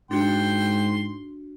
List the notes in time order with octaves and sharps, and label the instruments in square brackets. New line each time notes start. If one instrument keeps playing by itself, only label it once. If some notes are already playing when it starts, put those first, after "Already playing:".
[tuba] G#2 [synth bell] D4 F#4 [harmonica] G5 C6